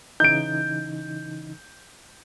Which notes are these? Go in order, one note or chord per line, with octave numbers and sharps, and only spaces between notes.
C#3 E3 D#4 G6 D7